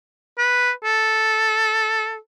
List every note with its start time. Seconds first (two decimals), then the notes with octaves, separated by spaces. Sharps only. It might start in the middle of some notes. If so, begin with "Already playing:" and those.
0.38 B4
0.84 A4